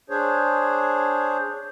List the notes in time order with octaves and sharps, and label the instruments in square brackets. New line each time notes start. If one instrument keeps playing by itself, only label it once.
[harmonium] D4 G#4 C5 C#5